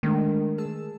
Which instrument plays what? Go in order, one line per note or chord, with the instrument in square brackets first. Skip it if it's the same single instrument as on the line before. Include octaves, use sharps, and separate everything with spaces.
[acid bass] D#3 [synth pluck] G#3 A3 D4
[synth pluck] G#4 A5 E6